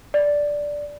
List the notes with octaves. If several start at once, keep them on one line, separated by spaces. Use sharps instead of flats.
D5